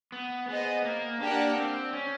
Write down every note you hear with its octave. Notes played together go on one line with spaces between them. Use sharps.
B3
B3 G#4 C5 D#5
A#3
A#3 D4 G4 A#4 D5 F#5
C4
C#4